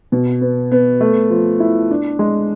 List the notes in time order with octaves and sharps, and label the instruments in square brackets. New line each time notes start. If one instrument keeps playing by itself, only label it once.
[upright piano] B2
B3
B3
A3
F3
E4
D4
G#3